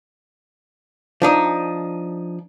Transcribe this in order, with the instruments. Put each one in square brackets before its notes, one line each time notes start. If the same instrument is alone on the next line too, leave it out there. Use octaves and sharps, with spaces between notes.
[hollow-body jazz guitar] F3 D4 D#4